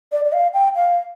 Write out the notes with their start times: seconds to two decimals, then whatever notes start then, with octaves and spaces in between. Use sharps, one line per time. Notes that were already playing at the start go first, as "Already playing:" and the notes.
0.12 D5
0.25 D5
0.33 F5
0.54 G5
0.75 F5